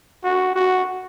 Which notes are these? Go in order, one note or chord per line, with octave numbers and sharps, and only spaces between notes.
F#4
F#4